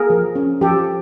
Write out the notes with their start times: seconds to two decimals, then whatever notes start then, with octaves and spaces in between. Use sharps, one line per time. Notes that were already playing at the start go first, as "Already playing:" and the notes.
Already playing: A#3 G#4 A#4
0.10 F3
0.35 C#4
0.61 F3 G4 A4